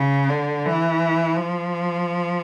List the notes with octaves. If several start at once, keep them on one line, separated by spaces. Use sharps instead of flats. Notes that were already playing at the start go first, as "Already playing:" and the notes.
Already playing: C#3
D3
E3
F3